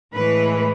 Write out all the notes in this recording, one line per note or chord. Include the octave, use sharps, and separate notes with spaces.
A2 E3 G#3 B4